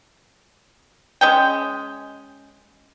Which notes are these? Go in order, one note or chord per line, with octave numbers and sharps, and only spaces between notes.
G#3 C#4 G5